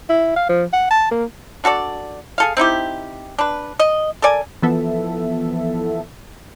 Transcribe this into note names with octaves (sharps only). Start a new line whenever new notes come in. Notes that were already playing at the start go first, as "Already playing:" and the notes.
E4
F5
F3
F#5
A5
A#3
D4 F#4 A4 D5
G#4 A4 F5
C4 D#4 E4 G4
D4 B4
D#5
A4 A#4 D5 G#5
E3 F3 B3 A4 E5